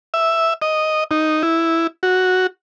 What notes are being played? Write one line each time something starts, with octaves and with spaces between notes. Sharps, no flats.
E5
D#5
D#4
E4
F#4